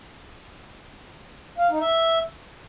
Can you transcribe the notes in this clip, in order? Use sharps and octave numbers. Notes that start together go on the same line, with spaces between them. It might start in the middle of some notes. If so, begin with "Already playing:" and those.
F5
D#4
E5